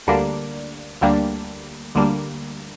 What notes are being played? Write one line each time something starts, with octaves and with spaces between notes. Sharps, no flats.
D2 D3 G3 A#3 D4
D2 D3 G3 A#3 D4
D2 D3 G3 A#3 D4